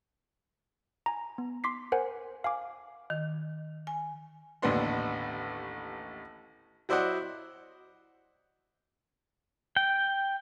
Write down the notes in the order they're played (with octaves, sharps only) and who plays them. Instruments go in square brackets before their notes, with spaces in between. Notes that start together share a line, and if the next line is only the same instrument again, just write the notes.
[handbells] G#5 A#5
B3
C6 D6 B6 C7
A#4 C5 F#5 G#5
F5 G#5 D6
[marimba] D#3
G#5
[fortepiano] A1 D#2 D3 B3 D4 C6
F#3 E4 C5 D5 D#5 F#5
[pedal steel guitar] G5